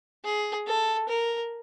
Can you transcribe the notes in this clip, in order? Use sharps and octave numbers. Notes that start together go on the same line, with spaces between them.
G#4
A4
A#4